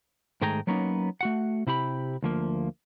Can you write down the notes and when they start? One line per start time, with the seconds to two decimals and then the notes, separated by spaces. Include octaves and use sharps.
0.42 G#2 D#3 A3 G#4 G5 A#5
0.67 F#3 A#3 B3 C#4 D#4
1.21 A3 F#4 F#5
1.67 C3 E4 G4 B5
2.23 D2 F3 A#3